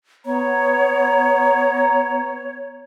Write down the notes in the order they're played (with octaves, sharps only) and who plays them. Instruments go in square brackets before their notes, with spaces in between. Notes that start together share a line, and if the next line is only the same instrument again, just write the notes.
[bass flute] B3 [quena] C#5 [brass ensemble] A#5